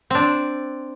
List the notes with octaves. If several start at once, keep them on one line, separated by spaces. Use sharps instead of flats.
C4 D4